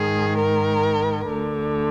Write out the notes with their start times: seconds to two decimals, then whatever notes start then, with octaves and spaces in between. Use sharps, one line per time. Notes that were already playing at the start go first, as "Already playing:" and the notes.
Already playing: G#2 D#3 G#4
0.38 A#4
1.29 D2 D3